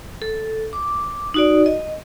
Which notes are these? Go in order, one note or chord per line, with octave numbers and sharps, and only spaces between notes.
A4
D6
D#4 F#4 D5
D#5